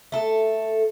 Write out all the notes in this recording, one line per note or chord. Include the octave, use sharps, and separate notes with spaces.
A3 A4